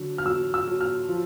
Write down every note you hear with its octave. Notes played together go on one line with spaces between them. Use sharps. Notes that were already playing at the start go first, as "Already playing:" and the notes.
Already playing: D3 F#3
F6
F#3 E6
E6
F#3
F6
F3